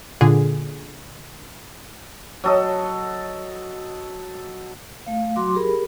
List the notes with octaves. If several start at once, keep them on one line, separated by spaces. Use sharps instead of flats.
A#2 D3 G#4
F#3 A4 D#5
A3 F5
F#3 F#4 C6 D6
G4 G#4 A#4 B5